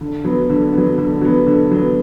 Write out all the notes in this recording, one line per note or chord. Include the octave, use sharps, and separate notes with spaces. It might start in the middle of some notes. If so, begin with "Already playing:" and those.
D3
F#3 B3
D3
F#3 B3
D3
F#3 B3
D3
F#3 B3